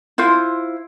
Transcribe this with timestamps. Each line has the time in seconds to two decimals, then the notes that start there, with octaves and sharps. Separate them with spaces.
0.18 E4 F4 C5